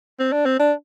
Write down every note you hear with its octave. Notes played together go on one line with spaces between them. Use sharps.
C4
D4
C4
D4